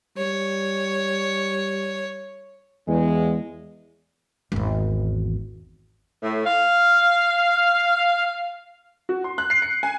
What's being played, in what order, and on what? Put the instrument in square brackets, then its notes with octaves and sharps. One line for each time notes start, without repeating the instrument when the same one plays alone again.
[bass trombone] G3 [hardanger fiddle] C#5
[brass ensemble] E2 G#3
[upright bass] G#1 E2
[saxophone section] A2
F5
[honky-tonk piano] F#4
C6
F#6
C7
C#7
G#5